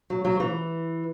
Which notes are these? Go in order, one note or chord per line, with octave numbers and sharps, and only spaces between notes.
F#3
F#3
E3